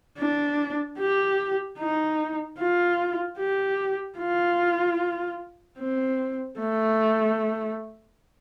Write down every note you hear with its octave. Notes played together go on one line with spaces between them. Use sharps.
D4
G4
D#4
F4
G4
F4
C4
A3